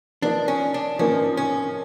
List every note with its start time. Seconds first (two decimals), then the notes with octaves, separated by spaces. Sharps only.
0.22 F3 A#3 D4 D#4
0.48 C#4
0.74 D4
0.99 F3 A#3 C#4 D#4
1.37 C#4